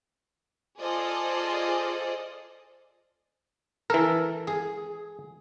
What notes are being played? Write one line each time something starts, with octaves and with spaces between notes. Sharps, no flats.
F4 G#4 A4 C5 D5 D#5
E3 A4 A#4
G#4